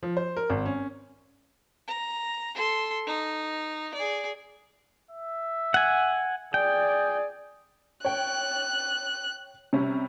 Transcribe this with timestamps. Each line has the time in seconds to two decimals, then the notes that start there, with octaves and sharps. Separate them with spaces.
0.03 F3
0.17 C5
0.37 A#4
0.50 G#1
0.66 C#4
1.87 A#5
2.54 A4 C6
3.07 D#4
3.95 G#4 D5
5.11 E5
5.74 F#5 G#5
6.54 G#4 D5 G5
8.05 C#5 G5 F#6
9.73 C3 G3 C#4